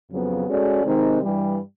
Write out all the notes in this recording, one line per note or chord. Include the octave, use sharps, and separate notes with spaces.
F2 C#3 F#3 B3
G#3 C#4 F#4 A4 D5
C3 D#3 G#3 C4 D#4
G2 E3 G3